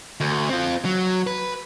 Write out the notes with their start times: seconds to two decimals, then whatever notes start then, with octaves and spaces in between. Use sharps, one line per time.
0.20 D2
0.49 C4 F4
0.85 F#3
1.27 B4